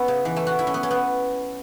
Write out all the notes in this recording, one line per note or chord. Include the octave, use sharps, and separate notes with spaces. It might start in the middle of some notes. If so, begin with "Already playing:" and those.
Already playing: B3 C#4 E4
C#3
E3
A3
F#4
E4
C#4
B3
C#4
B3